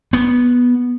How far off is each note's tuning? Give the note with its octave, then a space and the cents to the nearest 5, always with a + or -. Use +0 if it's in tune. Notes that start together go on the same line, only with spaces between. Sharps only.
B3 -10